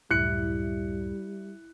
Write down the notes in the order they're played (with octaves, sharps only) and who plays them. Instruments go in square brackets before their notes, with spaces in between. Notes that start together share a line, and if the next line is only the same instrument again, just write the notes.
[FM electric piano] C#2 F#2 A2 [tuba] G3 [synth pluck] E4 [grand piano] F#6 C#7